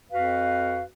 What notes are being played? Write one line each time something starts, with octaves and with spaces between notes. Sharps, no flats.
F2 F#4 B4 F5